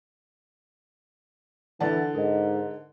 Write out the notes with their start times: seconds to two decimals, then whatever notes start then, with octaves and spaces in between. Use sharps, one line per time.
1.80 D3 E3 D5 F#5 A5 A6
2.15 G#2 A#4 D#5